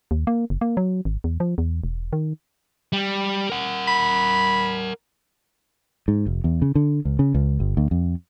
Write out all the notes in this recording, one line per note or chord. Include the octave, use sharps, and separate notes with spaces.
D#2
A#3
F#1
A#3
F#3
G#1
E2
F3
E2
E1
D#3
G3
A#4 F#5
B5
G#2
F1
E2
C#3
D3
C#2
C#3
C#2
G1
D2
F2